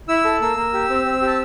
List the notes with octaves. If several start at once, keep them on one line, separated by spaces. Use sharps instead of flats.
E4 E6
A4
A#3 E6
A#3
G4
C4
C4
G4 A5